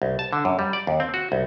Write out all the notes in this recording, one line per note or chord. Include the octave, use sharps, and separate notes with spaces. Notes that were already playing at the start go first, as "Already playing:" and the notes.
C2
A5
D3
F#2
G3
D5
D#2
C4
F#4
C2